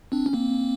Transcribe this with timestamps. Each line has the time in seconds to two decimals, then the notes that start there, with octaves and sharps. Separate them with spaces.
0.12 C4 D4
0.26 C#4
0.33 A#3 C4